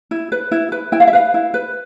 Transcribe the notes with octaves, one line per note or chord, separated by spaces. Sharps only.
E4
B4
E4
B4
E4 G5
F5
E5
B4 F5
E4
B4